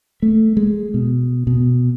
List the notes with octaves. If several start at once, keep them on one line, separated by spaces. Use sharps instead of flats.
A3
G#3
B2
B2